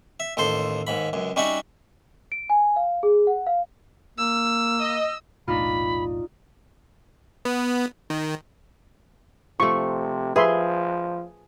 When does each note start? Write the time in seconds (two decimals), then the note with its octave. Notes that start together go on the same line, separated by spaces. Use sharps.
0.20 E5
0.37 A1 D#2 A4 C5 C6
0.87 D#2 G#2 B5
1.13 C#2 F#2
1.36 G3 C#4 D#4 F#4 E5 F#5
2.32 D7
2.50 G#5
2.76 F5
3.03 G#4
3.27 F#5
3.47 F5
4.18 A#3 E6
4.79 D#5
5.48 E1 B1 A2 D4 D#4 F4 B5
7.45 B3
8.10 D#3
9.60 C3 F3 A3 C#6
10.36 F3 G#4 B4 E5 C6